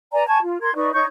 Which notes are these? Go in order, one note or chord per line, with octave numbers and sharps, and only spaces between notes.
B4 D5 G#5 A#5
G#5 A5 C#6 G#6
F4
A#4 C6 G#6
D#4 B4 D5 C#6
D#4 C#5 C#6 G6